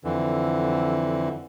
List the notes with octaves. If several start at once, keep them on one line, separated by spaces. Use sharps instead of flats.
F2 D3 E3